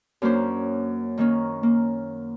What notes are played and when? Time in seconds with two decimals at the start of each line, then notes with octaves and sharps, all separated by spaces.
0.22 F#2 A#3 C#4 D4 C5
1.18 D#3 A#3 C#4
1.63 A#3